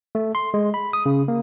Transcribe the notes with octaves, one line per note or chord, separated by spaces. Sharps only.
A3
C6
G#3
B5
D#6
C#3
A#3